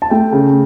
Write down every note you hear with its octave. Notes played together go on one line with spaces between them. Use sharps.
A5
A3 G5
C#3